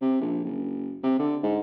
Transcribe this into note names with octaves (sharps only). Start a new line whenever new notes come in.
C3
A#1
F#1
C3
D3
G#2